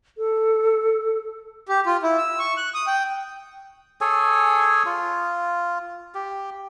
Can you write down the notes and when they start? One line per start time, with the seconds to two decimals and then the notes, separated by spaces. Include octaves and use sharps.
0.18 A4
1.69 G4
1.86 F4
2.03 E4
2.18 E6
2.39 C#6
2.57 F#6
2.74 D#6
2.87 G5
4.01 G#4 A4 C#5 G#5
4.86 F4
6.15 G4